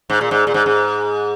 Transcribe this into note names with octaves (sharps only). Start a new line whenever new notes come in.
G#2
A#2
G#2
A#2
G#2
G#2